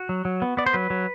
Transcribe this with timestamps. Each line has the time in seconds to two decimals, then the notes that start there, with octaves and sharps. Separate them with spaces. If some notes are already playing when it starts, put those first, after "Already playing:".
Already playing: F#4
0.09 F#3
0.25 F#3
0.42 B3
0.57 B3 D5
0.66 C5
0.73 F#3 B4
0.90 F#3